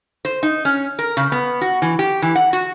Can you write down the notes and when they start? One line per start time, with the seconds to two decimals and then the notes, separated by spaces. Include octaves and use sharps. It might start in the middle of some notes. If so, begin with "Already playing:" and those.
0.25 C5
0.43 D#4
0.65 C#4
0.99 A#4
1.17 C#3
1.32 B3
1.61 F#4
1.82 E3
1.99 G4
2.22 E3
2.35 F#5
2.53 F#4